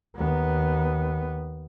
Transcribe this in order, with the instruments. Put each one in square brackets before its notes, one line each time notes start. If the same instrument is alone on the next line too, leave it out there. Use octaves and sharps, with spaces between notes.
[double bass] D#2 B3